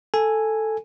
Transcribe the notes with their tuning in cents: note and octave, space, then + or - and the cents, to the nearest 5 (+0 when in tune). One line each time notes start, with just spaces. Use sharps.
A4 +0 G#5 +0